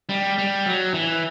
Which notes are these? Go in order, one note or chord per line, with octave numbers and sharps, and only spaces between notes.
G3
G3
F#3
E3